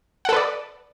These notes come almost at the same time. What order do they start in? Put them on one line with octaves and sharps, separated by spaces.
F#5 A4 B4 D5